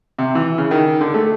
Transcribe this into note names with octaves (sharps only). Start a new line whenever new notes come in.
C3
E3
C#3
D#3
D3
A3